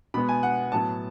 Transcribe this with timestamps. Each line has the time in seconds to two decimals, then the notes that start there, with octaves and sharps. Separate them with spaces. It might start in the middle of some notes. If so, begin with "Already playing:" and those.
0.14 B2 G#3 B3 B5
0.29 G#5
0.43 F#5
0.72 A2 F#3 B3 A5